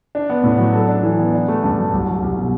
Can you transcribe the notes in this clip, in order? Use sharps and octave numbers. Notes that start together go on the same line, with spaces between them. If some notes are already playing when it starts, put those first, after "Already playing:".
D4
B3
A2
F#3
A4
D4
E3
B3
D4
A3
G2
F#3
C2
F#3
C2
B2